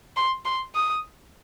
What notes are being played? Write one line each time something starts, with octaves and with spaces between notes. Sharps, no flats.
C6
C6
D#6